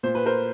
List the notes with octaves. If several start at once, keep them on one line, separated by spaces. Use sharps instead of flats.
A#2 C5
B4
A#4 C5